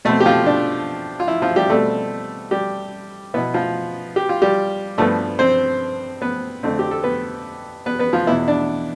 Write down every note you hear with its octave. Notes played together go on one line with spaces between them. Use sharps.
B2 A3 C4 A4
G4
F3 F4
D4
F4
E4
F3 F4
G3 G4
B2 G3 A3 C4 A4
G3 G4
B2 B3 E4
F3 F4
G4
F4
G3 G4
G2 F3 A3 B3 A4
C4 C5
B3 B4
F2 D3 A3 C4
G4
A4
B3 B4
B3 B4
B3 B4
F3 F4
E2 B2 B3 E4
D4